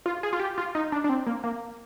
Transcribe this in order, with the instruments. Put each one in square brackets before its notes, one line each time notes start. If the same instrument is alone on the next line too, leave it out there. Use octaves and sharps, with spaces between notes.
[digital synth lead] F4
G#4
F4
G4
F4
D#4
D4
D4
C4
A#3
A#3